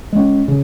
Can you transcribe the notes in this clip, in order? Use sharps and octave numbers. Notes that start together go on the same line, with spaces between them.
G#3 C#4
C#3